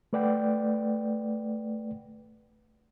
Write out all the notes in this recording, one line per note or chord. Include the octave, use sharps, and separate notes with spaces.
A3 B4 D5 F#5 G5